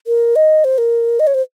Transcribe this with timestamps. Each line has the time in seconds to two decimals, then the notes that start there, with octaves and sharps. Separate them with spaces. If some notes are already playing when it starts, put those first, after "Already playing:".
0.07 A#4
0.36 D#5
0.64 C5
0.78 A#4
1.20 D#5
1.27 C#5
1.34 C5